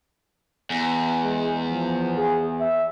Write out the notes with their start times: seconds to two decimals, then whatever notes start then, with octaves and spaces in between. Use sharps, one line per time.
0.70 E2
1.23 G#3
1.68 F3
2.17 G#4
2.60 E5